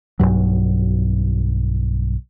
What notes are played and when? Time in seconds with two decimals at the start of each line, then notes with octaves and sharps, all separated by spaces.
0.20 B1 E2 G2 F#3